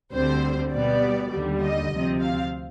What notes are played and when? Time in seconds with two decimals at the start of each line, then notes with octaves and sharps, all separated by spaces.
0.13 D2 D3 G3 C4 C5
0.72 B2 G3 B3 D5
1.31 D#2 D3 G3
1.62 D#5
1.91 D2 C3 F3 C4
2.21 F5